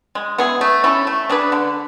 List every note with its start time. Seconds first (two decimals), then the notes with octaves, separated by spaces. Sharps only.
0.15 G#3
0.38 B3 E4 G#4
0.61 A3
0.84 C#4 E4 A4
1.07 A3
1.29 D4 G#4 B4
1.52 D3